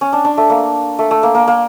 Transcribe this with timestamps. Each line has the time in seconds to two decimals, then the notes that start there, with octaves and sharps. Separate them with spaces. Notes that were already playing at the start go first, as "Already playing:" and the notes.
0.01 C#4
0.13 D4
0.25 D4
0.37 A3
0.50 A#3
0.99 A3
1.11 A3
1.23 A#3
1.34 A#3
1.48 A#3